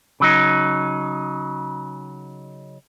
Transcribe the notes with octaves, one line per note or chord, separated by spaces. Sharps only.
C#3 F#3 D#4